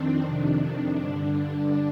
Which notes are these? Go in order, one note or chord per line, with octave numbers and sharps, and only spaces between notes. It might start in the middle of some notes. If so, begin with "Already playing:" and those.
Already playing: F2 D#3 C4 D4
F2 C3 D#3 D4
G2 D3 D4
D4